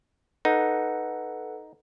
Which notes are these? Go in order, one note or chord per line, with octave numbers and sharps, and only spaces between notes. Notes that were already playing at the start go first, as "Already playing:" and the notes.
D#4 A4 B4 F#5